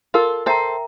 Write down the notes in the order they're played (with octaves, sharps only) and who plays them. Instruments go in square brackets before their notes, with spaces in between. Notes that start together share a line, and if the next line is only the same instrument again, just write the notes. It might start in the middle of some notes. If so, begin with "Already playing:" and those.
[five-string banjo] F4 A4 [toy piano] A#4
[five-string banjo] A4 C5 [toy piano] E5 G5 A#5